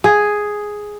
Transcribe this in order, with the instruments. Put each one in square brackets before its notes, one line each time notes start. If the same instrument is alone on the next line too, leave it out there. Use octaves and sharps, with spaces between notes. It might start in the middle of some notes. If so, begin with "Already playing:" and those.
[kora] G#4